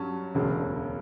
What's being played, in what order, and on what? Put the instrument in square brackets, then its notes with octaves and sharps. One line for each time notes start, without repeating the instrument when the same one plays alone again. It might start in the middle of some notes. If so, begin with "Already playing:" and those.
Already playing: [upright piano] G2 F#3 C#4 A5
E1 D2 C#3